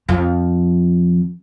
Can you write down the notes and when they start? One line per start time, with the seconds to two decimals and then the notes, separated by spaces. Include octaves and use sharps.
0.08 F2 F3